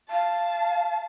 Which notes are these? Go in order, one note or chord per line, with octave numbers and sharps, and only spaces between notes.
F5 A5